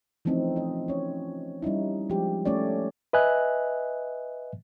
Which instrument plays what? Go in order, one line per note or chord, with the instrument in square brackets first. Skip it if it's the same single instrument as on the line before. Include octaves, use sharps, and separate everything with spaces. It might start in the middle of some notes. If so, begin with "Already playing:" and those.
[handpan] E3 F3 A3 C4 C#4 D#4
F4 D#5
C#4 C#5
G3 C#4 D#4 E4
F3 G#3 G4
A3 C#4 C#5 D5
[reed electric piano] B4 D#5 E5 G#5 F#6